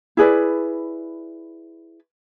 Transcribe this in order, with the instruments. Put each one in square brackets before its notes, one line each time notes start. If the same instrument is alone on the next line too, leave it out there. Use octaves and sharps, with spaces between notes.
[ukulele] E4 G#4 B4 D5